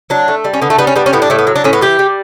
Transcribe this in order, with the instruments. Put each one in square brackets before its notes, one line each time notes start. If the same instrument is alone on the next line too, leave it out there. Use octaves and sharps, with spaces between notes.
[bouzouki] F#3 D4
A3
G3
C#4
D3 B3
A3
G3 B3
C#4
G3 B3
C#4
A2 B3
D4
A2 A3
B3
F#3
D4
A2 C#4
B3
E3 G4
G3